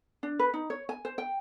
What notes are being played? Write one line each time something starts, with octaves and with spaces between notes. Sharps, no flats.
D4
B4
D#4
C#5
G#5
C5
G5